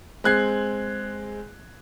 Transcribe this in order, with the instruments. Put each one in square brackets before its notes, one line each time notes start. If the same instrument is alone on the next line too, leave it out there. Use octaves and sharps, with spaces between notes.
[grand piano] G#3 C4 F#6 G#6 C7